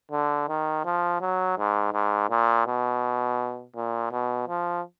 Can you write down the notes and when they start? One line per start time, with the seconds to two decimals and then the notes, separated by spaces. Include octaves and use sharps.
0.11 D3
0.49 D#3
0.85 F3
1.21 F#3
1.58 G#2
1.93 G#2
2.30 A#2
2.67 B2
3.76 A#2
4.11 B2
4.48 F3